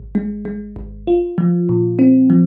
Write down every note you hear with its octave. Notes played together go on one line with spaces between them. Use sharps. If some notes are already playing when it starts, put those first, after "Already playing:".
Already playing: G#1
G#3
G#3
G#1
F4
F3
A#2
C4
F3